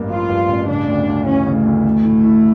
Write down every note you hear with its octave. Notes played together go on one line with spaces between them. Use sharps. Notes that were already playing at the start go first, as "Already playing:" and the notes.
Already playing: A1 G2 A#3
F3 F4
G2
A1
C#3 D4
D2
D2
E3 C#4
C#3
A3
D2
E3
A2
E4